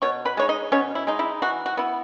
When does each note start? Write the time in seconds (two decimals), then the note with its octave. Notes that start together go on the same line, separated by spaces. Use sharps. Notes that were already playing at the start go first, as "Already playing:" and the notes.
0.02 B2 C#5 C#6
0.25 B4 B5
0.37 G#3 D#4 C#5
0.49 D#4 D#5
0.72 B2 C#4 C#5
0.95 E4
1.07 G#3 D#4
1.19 E4
1.42 E3 F#4
1.66 F#4
1.77 B3 E4